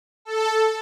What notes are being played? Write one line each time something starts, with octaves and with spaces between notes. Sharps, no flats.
A4